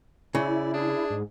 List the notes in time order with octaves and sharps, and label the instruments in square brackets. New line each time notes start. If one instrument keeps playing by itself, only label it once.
[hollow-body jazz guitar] C#3 [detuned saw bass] E4 [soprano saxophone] D5
[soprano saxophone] D4 [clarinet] G#4
[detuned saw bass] G#2